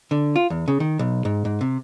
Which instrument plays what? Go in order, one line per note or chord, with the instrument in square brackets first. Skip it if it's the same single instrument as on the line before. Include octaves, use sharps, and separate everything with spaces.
[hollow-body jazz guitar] D3
F4
E2
C#3
D#3
B1
G#2
G#2
C3